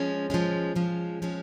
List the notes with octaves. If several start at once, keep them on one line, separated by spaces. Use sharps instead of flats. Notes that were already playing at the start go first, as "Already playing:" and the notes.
Already playing: F3 G#3 C#4
F3 G#3 C#4
F3 G#3 C#4
F3 G#3 C#4